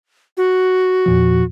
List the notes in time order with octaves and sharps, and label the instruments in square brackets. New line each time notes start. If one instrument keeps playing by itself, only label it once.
[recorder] F#4
[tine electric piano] E2 A#2 F3